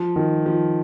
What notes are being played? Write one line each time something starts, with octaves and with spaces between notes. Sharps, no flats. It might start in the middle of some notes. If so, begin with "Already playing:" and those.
Already playing: F3
D#3
F3